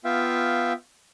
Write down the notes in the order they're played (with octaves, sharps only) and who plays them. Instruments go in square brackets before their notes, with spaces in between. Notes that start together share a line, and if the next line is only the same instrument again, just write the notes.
[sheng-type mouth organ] B3 F4 E5 F5 G5